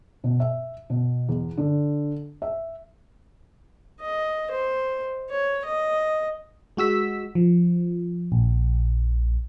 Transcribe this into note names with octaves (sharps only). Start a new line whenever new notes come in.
B2
E5
B2
E2
D3
E5
D#5
C5
C#5
D#5
G#3 F#4 E6 B6
F3
A#1